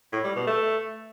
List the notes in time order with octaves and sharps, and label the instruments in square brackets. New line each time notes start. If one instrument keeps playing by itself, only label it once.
[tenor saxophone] A2
G3
B2
A3